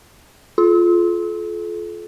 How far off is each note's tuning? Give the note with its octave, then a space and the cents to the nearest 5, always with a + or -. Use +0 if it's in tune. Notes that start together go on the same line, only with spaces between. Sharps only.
F4 +0 A4 -40